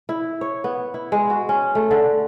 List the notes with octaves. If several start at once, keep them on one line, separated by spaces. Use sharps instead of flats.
E4
C#5
B3
E4
G#3
F#4
C#4
A3
D3